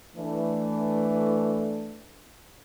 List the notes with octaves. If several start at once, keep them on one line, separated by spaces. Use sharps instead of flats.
E3 A3 D4